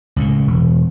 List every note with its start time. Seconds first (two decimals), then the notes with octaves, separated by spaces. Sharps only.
0.16 C#2 A2
0.47 E1